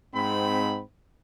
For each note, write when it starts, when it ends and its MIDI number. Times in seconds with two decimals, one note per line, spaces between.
0.15 0.81 44
0.15 0.81 60
0.15 0.81 83